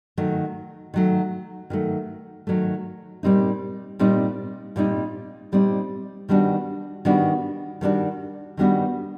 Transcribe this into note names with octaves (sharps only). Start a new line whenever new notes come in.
D#3 F#3 A3
D#3 F#3 A3
D#3 F#3 A3
D#3 F#3 A3
A#2 G3 C4 D#4
A#2 G3 C4 D#4
A#2 G3 C4 D#4
A#2 G3 C4 D#4
D#3 G3 B3 D4 F#4
D#3 G3 B3 D4 F#4
D#3 G3 B3 D4 F#4
D#3 G3 B3 D4 F#4